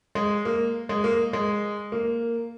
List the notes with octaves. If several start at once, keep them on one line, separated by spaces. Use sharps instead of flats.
G#3
A#3
G#3
A#3
G#3
A#3